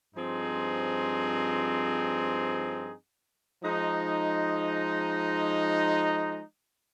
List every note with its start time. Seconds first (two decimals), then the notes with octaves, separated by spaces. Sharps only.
0.15 G2 F3 C4 D#4 G#4
3.63 F3 G#3 D#4